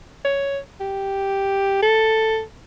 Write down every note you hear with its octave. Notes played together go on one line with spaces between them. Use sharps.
C#5
G4
A4